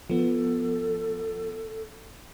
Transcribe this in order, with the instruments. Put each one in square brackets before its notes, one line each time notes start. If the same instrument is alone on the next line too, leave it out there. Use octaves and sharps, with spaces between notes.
[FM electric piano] F3 B3 [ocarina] A4